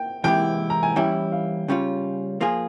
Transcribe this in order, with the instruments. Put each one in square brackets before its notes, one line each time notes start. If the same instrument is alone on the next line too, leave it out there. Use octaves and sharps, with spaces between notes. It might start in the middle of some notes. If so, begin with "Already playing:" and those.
Already playing: [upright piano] G5
[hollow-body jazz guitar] C3 E3 G#3 E4 G4 [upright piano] G5
[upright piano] A#5
G#5
[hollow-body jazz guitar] E3 G3 C#4 E4 [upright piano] G5
[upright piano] F5
[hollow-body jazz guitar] C#3 G3 C#4 F4
F3 A#3 F4 G#4